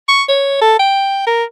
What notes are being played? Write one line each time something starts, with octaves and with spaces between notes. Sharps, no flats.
C#6
C#5
A4
G5
A#4